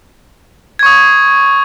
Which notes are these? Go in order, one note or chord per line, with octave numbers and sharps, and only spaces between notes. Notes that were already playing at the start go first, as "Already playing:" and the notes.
C#6 D#6 G#6